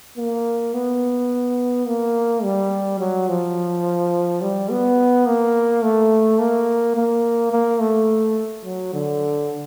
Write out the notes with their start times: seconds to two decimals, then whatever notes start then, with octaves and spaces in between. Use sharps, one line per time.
0.18 A#3
0.74 B3
1.87 A#3
2.43 G3
2.99 F#3
3.29 F3
4.42 G3
4.70 B3
5.26 A#3
5.83 A3
6.39 A#3
6.95 A#3
7.52 A#3
7.81 A3
8.65 F#3
8.94 D3